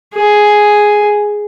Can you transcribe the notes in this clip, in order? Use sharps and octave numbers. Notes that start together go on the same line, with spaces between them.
G#4